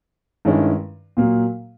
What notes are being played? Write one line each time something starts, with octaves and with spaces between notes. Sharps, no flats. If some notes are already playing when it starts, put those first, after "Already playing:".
G2 D#3 G#3 C#4 E4
A#2 F#3 A#3